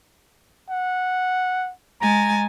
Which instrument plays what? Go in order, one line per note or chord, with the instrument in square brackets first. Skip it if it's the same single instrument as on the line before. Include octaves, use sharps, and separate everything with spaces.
[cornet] F#5
[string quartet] G#3 G#5 A6 [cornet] A#5